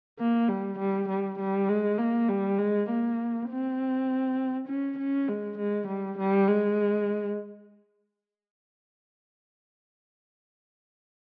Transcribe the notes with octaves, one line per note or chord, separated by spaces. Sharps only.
A#3
G3
G3
G3
G3
G#3
A#3
G3
G#3
A#3
C4
C#4
C#4
G#3
G#3
G3
G3
G#3